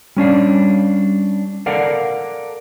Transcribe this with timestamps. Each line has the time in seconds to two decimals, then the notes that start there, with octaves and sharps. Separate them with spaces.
0.17 G3 C#4 D4 F5
1.66 A4 A#4 D5 F5 F#5